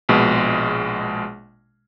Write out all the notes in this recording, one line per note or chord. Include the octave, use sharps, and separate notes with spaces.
A#1 B2 G#3